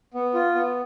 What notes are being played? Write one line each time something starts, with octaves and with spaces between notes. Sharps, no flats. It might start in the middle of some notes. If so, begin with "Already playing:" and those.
B3
F4
B3